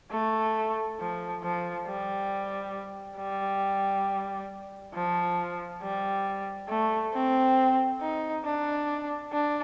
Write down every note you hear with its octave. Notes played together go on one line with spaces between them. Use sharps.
A3
F3
F3
G3
G3
F3
G3
A3
C4
D#4
D4
D4